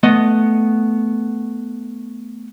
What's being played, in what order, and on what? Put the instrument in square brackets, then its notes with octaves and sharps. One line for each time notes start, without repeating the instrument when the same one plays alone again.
[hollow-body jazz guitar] A3 B3 D#5